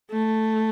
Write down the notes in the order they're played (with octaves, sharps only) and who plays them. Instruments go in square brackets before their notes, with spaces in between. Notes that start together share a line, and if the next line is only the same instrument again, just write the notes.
[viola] A3